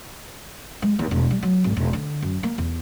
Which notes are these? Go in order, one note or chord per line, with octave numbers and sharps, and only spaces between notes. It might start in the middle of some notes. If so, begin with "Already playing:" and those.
G#3
D#2
E1
G3
F#3
G#1
E1
D3
F#2
A#3
E2